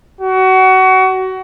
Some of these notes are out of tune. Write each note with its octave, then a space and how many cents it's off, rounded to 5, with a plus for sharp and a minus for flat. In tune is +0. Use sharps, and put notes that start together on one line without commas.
F#4 +25